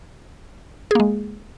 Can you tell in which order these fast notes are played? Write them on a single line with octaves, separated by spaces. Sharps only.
G#4 A#3 G#3